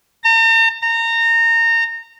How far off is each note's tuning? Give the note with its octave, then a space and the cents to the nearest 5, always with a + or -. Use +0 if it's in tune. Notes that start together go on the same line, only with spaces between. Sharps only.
A#5 -45
A#5 -25